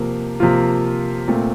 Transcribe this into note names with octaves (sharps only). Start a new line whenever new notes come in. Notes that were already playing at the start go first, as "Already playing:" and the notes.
Already playing: C3 F3 A#3
C3 F3 A#3 F4
A#2 A3 C4